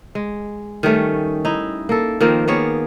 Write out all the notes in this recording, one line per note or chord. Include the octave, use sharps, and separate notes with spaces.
G#3
D#3 G3 A3 C#4
D#4 E4
A#3 A4
D#3 F3 A#3 C4
A#3 B3 G#4 C#5